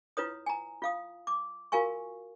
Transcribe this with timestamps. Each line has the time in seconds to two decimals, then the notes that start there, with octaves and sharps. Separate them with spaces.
0.17 E4 F4 B4 C#5 D#6
0.46 G#5 A#5
0.82 F4 F5 D#6
1.27 D6
1.72 F4 F#4 A#4 F5 G#5 C#6